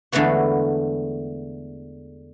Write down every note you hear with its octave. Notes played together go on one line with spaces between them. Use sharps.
E2 D3 G#3 A3 B3 F#4